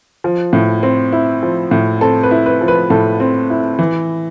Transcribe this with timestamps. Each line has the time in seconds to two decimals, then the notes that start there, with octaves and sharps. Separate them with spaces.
0.24 F3
0.53 A2
0.83 C4
1.12 E4
1.43 F3
1.71 A2
2.01 C4 A4
2.23 B4
2.31 E4
2.46 B4
2.61 F3
2.68 B4
2.90 A2 A4
3.20 C4
3.50 E4
3.79 E3